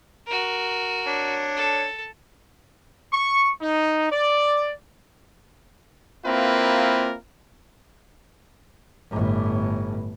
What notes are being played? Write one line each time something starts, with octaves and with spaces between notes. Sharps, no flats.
F#4 A#4
D4 C#5
A4
C#6
D#4
D5
A#3 C4 E4 F4 A#4 B4
G1 A2